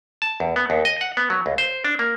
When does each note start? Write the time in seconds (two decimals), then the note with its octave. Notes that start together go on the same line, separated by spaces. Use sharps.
0.22 A5
0.40 E2
0.56 B3
0.70 D#2
0.85 D#5
1.01 F#5
1.17 B3
1.30 F#3
1.46 C#2
1.58 C5
1.85 D4
1.99 A#3